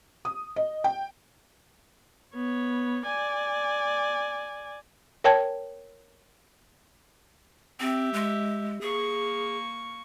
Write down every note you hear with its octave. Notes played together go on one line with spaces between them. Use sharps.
D#6
D#5
G5
B3 C#5
D5 G#5
A#4 C#5 G5 A5 G#6
C4 G4 E5
G#3
A#3 G#4 C#6